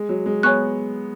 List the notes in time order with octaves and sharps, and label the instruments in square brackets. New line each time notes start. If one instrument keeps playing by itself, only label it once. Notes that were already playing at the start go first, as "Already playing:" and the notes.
Already playing: [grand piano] G#3
F#3
G#3
[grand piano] B3 [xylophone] C#5 G#5 C#6 F#6